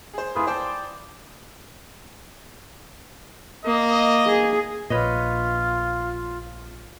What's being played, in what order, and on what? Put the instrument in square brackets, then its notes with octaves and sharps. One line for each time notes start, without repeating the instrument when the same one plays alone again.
[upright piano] G#4 C5
[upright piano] F1 E4 [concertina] F4 G#4 B4
[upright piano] C5 G5 A5 [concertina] D5
[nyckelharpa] A#3 [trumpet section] D#5
[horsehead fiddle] G#4
[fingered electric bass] A#1 A#2 [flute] F4 [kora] B4 C#5 D#5